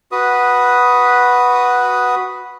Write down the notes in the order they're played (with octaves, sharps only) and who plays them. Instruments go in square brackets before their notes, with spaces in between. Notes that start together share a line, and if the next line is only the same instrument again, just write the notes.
[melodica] F#4 B4 D#6